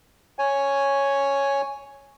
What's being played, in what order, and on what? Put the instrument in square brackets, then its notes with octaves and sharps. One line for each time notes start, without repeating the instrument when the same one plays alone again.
[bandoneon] C#5 G#5